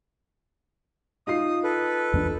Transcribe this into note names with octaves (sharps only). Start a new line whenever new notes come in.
D#4 F4 D#6 C7
A4 B4
E2 A#3 D4